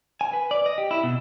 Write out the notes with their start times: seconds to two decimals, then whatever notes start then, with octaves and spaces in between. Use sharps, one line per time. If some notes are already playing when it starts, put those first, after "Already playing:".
0.21 G#5
0.33 B4
0.51 D5
0.66 D#5
0.78 G4
0.91 E4
1.03 B2